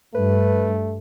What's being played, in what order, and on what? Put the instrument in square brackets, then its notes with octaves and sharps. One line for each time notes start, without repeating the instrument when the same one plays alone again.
[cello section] G2 [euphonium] A3 [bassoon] B4